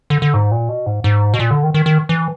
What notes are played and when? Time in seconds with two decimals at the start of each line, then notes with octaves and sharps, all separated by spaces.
0.10 D3
0.22 D3
0.34 G#2
0.51 A#2
0.69 B2
0.86 G#2
1.04 G#2
1.34 B2
1.39 A#2
1.51 D3
1.63 D#3
1.74 D#3
1.86 D#3
2.09 E3